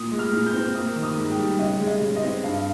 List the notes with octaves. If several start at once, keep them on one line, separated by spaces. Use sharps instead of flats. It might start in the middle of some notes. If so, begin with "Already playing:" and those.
Already playing: A#2 D#6
G#3
F6
A#2
G6
C4
A#3 D#6
D#3
D#6
G#2
G5
G3
C#3 D#5
G#3
D#5
C#3
D#5
C4
G2 F5